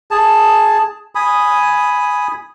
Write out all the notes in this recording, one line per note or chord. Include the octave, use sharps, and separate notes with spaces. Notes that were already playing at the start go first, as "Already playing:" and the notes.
G#4 A5
G#5 B5 D#6